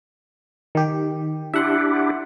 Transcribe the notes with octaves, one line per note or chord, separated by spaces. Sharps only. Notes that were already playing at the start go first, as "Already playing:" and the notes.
D#3 G4
D4 E4 G4 E5 F#5 C6